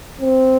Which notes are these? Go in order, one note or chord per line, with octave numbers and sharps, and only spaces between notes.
C4